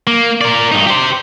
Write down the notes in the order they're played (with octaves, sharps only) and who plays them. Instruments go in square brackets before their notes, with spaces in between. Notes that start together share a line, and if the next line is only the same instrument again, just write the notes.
[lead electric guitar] A#3
A#4 D5
G2 D#4
G4 C5